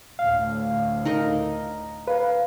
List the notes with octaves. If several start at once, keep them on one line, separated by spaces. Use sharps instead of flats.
D2 A2 F5
D#4 A#4 D#5
B4 F5